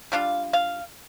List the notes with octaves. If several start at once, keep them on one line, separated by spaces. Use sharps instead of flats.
G3 D4 F4 F5
F5